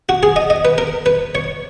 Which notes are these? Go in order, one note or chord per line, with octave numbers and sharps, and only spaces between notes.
F#4
G#4
D#5
D#5
B4
A#4
B4
C#5